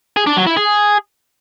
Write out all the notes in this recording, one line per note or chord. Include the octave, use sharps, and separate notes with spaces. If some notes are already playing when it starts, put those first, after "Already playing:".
G#4
D4
F#3
E4
G#4